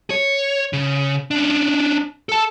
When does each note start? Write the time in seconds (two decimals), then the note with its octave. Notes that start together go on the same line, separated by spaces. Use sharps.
0.10 C#5
0.73 C#3
1.31 C#4 D4
2.29 A4 A5